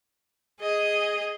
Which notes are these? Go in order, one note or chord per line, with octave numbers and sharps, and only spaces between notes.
G#4 D#5